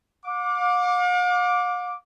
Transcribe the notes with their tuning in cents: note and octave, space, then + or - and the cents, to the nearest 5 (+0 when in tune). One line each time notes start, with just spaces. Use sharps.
F5 +45 D6 +0